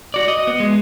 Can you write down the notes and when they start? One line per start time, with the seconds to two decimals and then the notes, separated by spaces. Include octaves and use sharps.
0.14 F#4 D5
0.28 D#5
0.47 B3
0.60 G#3